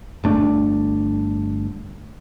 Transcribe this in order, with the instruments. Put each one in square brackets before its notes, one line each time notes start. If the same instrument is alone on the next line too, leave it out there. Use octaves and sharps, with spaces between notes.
[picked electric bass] G1 A3 D4